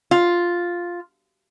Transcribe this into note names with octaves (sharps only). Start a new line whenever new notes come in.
F4